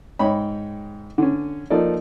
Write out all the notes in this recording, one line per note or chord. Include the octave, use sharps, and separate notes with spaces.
G#2 C#5 D#5 G5 B5
D3 C#4
F3 A#3 D#4 A4 D5